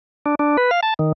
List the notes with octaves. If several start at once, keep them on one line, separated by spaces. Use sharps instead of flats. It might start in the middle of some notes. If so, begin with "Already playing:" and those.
D4
D4
B4
F5
A5
D#3